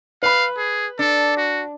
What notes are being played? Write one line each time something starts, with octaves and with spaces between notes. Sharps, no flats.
B4 F5 B5
G#4
D4 A4
F#4